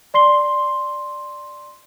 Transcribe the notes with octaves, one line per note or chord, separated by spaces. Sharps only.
D5 C6 C7 G7